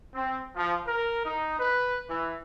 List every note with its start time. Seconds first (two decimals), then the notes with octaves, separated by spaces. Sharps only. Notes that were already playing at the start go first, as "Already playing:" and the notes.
0.15 C4
0.56 F3
0.87 A#4
1.25 D#4
1.59 B4
2.10 E3